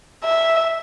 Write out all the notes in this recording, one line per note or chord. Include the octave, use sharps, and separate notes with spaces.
E5